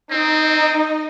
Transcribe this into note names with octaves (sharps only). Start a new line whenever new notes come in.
C4 D#4 D#5